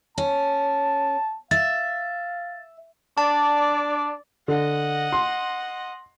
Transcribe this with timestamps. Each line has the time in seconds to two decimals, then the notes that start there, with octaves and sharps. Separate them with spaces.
0.18 C#4 A5
1.51 E5 F5 A6
3.18 D4 D5 A5
4.48 D3 D#5 F#5
5.12 C6